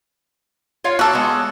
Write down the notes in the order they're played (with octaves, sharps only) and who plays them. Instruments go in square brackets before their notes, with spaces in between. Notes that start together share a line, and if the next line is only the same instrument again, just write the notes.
[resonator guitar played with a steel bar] F4 C#5 F5
[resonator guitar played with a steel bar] A#3 [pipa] F#4 A4
[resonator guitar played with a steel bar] G#3 B3